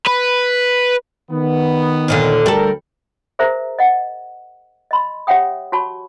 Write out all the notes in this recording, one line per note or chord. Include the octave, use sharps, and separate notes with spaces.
B4
D#3 B3
D#2 A#2 D3
D2 G3 A4 A#4
G#4 A#4 C5 E5 A#5
D#5 F#5
D#5 B5 C6
G4 C#5 E5 F#5 G5 D#6
F#4 C#5 A5 B5 C#6